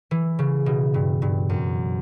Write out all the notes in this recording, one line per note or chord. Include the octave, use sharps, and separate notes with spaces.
E3
C#3
B2
G2
G2
F#2